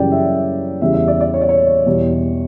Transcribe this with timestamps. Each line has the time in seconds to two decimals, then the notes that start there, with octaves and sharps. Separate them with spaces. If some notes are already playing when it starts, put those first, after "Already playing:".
Already playing: F#2 C#3 E3 G3 D5 G5
0.12 E5
0.81 E2 C#3 G3 E5
0.94 E5
1.08 D5
1.20 D5
1.34 C#5
1.41 D5
1.49 C#5
1.86 E2 B2 G3